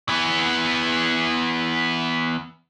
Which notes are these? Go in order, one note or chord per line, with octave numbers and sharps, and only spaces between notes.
E3 B3